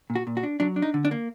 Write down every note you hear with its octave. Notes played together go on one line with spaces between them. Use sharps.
A#2
F#4
A#2
F#4
D4
F#3 D4
D4
D#4
D3
D4
A#3